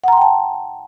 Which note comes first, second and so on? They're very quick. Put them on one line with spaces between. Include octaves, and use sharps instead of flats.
F#5 A#5 C6 G5 A5